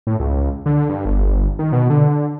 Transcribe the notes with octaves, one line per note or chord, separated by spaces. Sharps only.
A2
C#2
D3
G2
G1
D#3
B2
D3